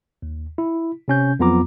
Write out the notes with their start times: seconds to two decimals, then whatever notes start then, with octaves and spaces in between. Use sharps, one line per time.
0.22 D#2
0.58 E4
1.08 C3 C#4 G6
1.39 F2 F#3 B3 F4 A#5 D6